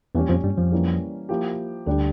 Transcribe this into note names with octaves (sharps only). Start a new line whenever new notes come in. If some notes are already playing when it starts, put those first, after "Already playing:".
E2 A#2 E3 G3 C#4 G4
F2 F3
G2 G3
F2 F3
E3 G3 A#3 C#4
F3 A#3 E4 G4
D2 D3 G3 D4 G4